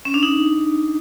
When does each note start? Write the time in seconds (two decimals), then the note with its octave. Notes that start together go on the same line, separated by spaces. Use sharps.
0.05 C#4
0.14 D4
0.23 D#4